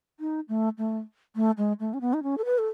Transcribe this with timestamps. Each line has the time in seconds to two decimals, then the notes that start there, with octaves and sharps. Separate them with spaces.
0.20 D#4
0.49 A3
0.78 A3
1.36 A3
1.58 G#3
1.80 A3
1.94 C#4
2.01 B3
2.13 D#4
2.23 C#4
2.38 A4
2.45 B4
2.58 A4